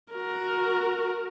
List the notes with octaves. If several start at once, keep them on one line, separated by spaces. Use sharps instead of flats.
F#4 A#4